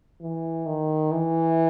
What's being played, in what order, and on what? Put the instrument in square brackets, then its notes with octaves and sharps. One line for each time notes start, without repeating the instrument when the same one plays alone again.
[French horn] E3
D#3
E3